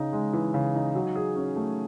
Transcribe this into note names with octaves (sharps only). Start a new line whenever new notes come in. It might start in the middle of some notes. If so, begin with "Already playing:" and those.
Already playing: C#3 D#4
G#3
E3
C#3
D#4
F#3
G#4
C#4
A3